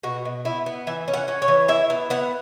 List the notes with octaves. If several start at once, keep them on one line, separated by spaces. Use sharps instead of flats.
B2 F#4
B2
B3 E4
B3
E3 E5
C#4
F#5
C#4
C#5
E3
E4 E5
B3
B3 F#5